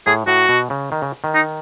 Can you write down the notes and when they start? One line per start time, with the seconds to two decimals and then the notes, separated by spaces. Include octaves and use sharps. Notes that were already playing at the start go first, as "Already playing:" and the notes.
0.06 A2 G#4
0.27 A2 F#4
0.49 B2
0.70 C#3
0.92 D#3
1.02 C#3
1.24 D#3
1.34 D#4